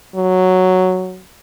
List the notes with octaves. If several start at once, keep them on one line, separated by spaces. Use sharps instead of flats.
F#3